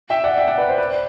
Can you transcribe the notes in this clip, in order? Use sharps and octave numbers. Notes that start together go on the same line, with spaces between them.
E5 G5
D5 F#5
E5 G5
D5 F#5
B4
C5
B4 D5